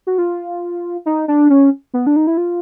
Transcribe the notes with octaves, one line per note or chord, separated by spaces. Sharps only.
F#4
F4
D#4
D4
C#4
B3
D4
D#4
E4
F4